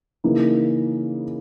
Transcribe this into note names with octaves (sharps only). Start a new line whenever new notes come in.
C#3 E3 A#3 D#4